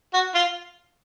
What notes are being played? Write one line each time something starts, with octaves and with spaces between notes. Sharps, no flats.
F#4
F4